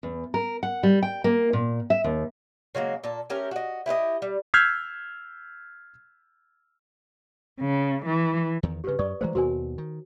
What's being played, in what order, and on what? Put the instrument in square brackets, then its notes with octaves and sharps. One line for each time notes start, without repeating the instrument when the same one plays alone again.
[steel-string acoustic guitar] E2
A#4
F#5
G3
G5
A#3
A#2
E5
D#2
[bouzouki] C#3 F#3 G#3 A#3
A#2 A4
A3 C#4 G4 A#4
F#4 D#5
E4 G4 B4 D#5
G3
[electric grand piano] E6 F6 G6 G#6 B6 C7
[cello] C#3
E3
[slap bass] E2 D#3
[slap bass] G2 C#3 [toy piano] G4 B4
[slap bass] F#2 [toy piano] D5 C#6 D#6
[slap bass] E3 G#3 A3 [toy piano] C5 A#5
[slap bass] D#2 B2 [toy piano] F#4 A#4 G#5
[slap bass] D#3